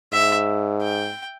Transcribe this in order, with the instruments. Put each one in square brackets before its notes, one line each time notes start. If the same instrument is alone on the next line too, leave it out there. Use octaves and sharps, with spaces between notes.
[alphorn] G#2 [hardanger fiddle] E5
[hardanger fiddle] G5